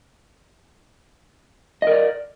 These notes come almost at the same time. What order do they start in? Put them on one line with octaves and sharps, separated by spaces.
D#5 A#4 D5